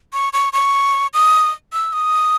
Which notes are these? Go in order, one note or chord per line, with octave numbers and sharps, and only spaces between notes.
C#6
C#6
C#6
D#6
E6
D#6